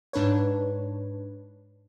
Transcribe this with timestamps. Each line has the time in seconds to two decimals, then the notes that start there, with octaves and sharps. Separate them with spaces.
0.13 G#2 D4 B4 C#5